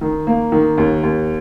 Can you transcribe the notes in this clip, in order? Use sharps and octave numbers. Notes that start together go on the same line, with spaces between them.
D#3
A#3
D#3
D#2
D#2